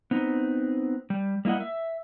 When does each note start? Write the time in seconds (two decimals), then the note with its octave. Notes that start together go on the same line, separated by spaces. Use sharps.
0.11 B3 C4 D#4
1.10 G3
1.45 G3 A#3 E4 D#5 F#5
1.60 E5